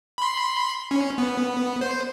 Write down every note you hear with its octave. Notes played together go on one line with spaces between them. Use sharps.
B5 C6
C#4
B3
C5